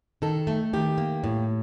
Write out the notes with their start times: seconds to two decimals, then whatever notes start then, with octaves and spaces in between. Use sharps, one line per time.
0.22 D#3 A4
0.47 A3
0.73 D#3 G4
0.98 A#3
1.24 A2